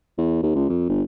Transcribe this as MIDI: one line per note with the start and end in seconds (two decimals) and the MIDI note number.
0.18 0.38 40
0.43 0.54 39
0.55 0.65 37
0.69 0.88 41
0.89 1.02 31